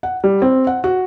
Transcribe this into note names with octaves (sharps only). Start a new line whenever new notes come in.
F#5
G3
C4
F#5
F#4